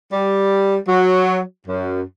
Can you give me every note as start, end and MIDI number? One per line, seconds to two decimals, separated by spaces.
0.12 0.77 55
0.88 1.40 54
1.66 2.01 42